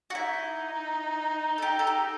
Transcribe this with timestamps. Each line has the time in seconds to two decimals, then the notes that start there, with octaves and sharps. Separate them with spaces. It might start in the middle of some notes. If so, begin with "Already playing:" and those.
0.10 F#4
0.14 D#4 E4
1.58 A4
1.62 G4
1.79 A4
1.87 G4